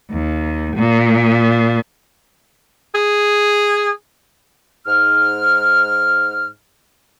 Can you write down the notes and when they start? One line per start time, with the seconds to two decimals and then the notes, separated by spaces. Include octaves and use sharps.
0.11 D#2
0.76 A#2
2.95 G#4
4.87 G#2 F6